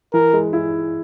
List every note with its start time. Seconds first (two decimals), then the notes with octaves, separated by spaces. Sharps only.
0.14 E3 A#4
0.33 G#3
0.53 E4